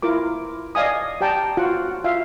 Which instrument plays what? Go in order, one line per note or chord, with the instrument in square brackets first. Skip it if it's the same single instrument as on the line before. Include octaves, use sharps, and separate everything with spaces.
[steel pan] E4 F4 A#4 D6
D5 D#5 F5 G#5 D#6
G4 D5 G5 A5 A#5
F4 F#4 F#5
F4 E5 F5